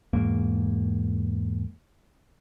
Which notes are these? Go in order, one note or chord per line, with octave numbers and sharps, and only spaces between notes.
E2 G#2 A#3